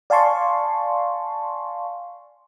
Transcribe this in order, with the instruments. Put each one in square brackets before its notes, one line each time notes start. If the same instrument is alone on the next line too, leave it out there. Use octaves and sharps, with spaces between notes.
[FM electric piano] D5 F5 G#5 A5 C6 C#6